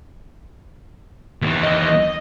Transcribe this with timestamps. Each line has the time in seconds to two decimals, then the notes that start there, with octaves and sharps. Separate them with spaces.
1.42 D#2 E3
1.63 D#5